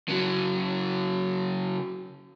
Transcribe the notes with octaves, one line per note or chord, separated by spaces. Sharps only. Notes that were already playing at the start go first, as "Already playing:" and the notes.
C#3 F#3